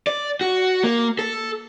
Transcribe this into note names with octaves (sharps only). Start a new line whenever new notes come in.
D5
F#4
A#3
A4